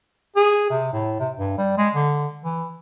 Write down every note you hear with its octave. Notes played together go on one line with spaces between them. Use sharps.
G#4
C3
A2
C3
G2
G3
G#3
D3
E3